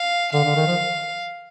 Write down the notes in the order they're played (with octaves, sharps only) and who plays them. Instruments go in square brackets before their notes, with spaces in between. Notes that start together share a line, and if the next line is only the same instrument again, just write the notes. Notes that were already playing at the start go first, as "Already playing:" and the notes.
Already playing: [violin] F5
[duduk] D3 [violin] F5
[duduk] D3
D#3
F3